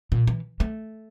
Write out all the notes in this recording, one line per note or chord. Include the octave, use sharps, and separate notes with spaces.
A#2
E3
A3